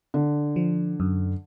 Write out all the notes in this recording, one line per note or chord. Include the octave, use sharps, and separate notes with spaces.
D3
F3
F#2